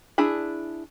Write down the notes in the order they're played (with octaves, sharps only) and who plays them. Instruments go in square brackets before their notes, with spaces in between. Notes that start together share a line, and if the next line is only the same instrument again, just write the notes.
[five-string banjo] D4 E4 G#4 B5